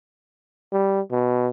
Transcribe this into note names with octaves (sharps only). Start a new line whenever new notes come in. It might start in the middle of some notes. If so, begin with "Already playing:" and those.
G3
B2